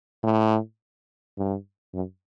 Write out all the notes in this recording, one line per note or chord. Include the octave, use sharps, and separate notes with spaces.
A2
G2
F#2